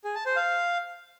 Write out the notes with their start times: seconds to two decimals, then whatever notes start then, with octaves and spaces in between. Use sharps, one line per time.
0.05 G#4
0.15 A5
0.26 C5
0.36 F5